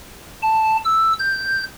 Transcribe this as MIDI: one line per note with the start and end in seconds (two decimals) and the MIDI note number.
0.43 0.77 81
0.85 1.13 88
1.19 1.63 91